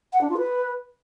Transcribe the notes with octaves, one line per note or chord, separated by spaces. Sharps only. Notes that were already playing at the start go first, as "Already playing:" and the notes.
F#5
D4
F4
B4